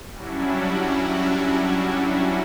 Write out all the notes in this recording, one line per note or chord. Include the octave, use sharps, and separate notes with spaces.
F#3 G3 C#4 D4 E4 F#4